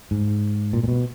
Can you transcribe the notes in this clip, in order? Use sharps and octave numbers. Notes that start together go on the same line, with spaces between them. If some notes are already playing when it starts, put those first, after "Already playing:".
G#2
A#2
A#2
B2